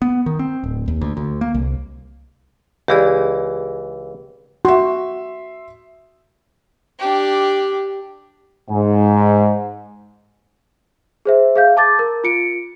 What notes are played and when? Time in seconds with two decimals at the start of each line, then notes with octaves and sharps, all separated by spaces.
0.02 B3
0.26 D#3
0.39 C4
0.64 D1
0.88 D#2
1.01 D2
1.17 D2
1.41 A#3
1.54 C2
2.88 C#2 E3 G4 G#4 D5
4.65 F#4 E5 C6
6.99 D4 G4
8.69 G#2
11.25 G#4 C5 E5
11.56 G#4 F5 G6
11.77 A5 D6 A6
11.99 A#4
12.24 F4 C#7 D7